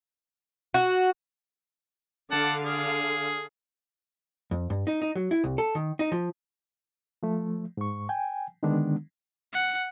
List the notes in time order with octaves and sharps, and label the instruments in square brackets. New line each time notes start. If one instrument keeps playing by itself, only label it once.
[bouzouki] F#4
[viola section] D3 F5 [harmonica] F#5 A5 D6
[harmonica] G#4
[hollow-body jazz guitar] F2
G2
D#4
D#4
F#3
E4
C2
A4
D#3
D#4
F3
[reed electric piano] F3 A3
G#2 C#6
G5 G#5
D3 D#3 G#3 B3 D4
[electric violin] F#5